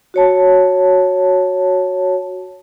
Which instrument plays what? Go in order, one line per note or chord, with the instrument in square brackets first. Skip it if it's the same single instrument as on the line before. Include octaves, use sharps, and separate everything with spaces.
[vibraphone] F#4 C#5 A5